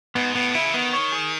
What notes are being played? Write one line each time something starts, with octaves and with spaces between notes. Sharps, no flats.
G#2 B3
A2 B3
C#3 E4
E3
D#3 B3
C#5
G#4